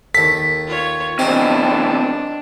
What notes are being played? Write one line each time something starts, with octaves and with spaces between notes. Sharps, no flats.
D#2 A4 B6
F4 C#5
E2 C3 D4 D#4 G4 C5